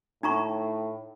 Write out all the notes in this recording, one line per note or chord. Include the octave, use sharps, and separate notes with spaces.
A2 D#4 A#5 C#6